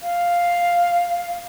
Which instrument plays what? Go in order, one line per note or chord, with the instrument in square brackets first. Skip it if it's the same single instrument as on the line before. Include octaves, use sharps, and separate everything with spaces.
[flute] F5